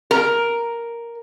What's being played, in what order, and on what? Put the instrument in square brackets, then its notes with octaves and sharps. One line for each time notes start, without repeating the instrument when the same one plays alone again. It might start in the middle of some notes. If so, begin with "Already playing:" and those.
[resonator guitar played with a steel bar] A#4